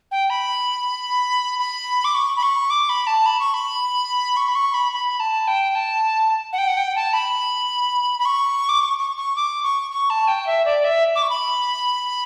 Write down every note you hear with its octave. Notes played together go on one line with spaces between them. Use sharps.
G5
B5
B5
D6
C#6
B5
C#6
D6
B5
A5
B5
C#6
B5
C#6
B5
C#6
B5
B5
A5
G5
A5
F#5
G5
F#5
G5
A5
B5
B5
C#6
D6
C#6
C#6
C#6
D6
C#6
C#6
A5
G5
E5
D5
E5
D6
C#6
B5